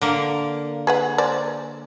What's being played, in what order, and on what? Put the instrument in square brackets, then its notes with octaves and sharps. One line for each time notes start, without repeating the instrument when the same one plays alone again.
[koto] D3 A#3
[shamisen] G#4 B4 F#5
G#3 C5 D5